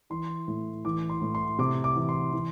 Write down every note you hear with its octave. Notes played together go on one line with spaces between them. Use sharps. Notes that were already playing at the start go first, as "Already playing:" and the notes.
E3 C6
A2
E3 D6
C6
A2
C6
C3 D6
D6
E3
C6
E3